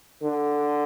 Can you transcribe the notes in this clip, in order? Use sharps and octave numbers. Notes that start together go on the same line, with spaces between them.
D3